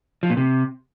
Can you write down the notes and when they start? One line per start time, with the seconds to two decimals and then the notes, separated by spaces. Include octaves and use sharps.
0.23 F3
0.30 A#2
0.37 C3